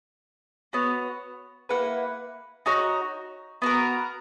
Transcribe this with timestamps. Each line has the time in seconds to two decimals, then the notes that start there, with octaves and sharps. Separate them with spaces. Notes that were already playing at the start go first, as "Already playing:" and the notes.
0.73 B3 F#4 C#5
1.69 A#3 E4 B4 F#5
2.66 D#4 F#4 C#5
3.62 B3 F#4 A#4